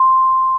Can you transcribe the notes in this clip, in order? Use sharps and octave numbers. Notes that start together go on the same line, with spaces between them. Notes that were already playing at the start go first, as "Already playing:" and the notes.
Already playing: C6